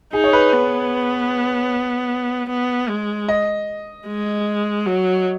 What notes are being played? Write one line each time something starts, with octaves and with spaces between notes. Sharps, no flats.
D#4 G#4
C#5
B4
B3
B3
G#3
D#5
G#3
F#3